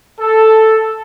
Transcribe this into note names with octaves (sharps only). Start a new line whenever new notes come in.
A4